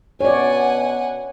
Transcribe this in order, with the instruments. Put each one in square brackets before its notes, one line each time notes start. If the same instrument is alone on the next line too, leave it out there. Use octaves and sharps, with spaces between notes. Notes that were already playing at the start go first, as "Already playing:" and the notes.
[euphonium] B2 [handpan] C#5 D5 [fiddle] F#5 G#5